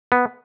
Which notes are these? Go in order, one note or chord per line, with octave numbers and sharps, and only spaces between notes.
B3